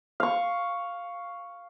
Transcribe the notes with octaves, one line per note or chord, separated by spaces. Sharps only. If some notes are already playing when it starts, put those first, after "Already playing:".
F5 C#6